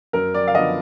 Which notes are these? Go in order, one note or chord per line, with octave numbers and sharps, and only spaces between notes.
F#2 A#4
D5
F5
D3 F3 B3 D#5